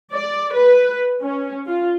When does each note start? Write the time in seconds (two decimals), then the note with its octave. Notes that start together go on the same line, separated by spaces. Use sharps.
0.12 D5
0.53 B4
1.21 C#4
1.66 F4